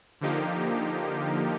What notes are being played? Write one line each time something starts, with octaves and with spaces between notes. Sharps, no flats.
D3 F3 A#3 D#4 G4